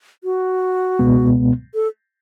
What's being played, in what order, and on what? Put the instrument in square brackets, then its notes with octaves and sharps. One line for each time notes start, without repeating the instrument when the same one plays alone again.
[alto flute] F#4
[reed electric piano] C#2 B2 G#3 B3
[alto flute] A4